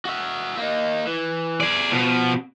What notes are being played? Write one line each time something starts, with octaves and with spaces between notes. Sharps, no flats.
F#4 E5
A#3 D#4
E3
G#4 D5
B2 F3